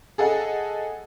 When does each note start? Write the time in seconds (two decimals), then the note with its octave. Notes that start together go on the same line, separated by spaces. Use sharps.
0.18 G#4 A4 D#5 F#5